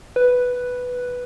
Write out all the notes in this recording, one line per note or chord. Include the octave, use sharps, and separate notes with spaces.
B4